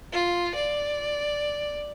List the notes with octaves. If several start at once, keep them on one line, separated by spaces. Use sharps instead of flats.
F4
D5